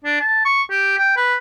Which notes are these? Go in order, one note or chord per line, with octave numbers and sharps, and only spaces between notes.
D4
A5
C#6
G4
G5
B4